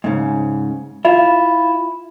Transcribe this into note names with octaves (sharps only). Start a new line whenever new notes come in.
G#2 C#3
E4 F4